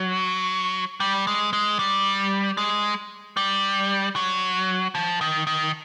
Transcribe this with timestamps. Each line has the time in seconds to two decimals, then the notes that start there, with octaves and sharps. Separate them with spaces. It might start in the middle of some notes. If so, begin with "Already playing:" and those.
Already playing: F#3
1.00 G3
1.27 G#3
1.53 G#3
1.79 G3
2.57 G#3
3.37 G3
4.16 F#3
4.95 F3
5.21 D#3
5.47 D#3